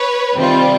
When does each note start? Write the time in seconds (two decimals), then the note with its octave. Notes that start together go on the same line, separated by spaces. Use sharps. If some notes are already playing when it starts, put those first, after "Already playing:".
Already playing: B4 C#5
0.35 C3 D#3 G3 C4 F4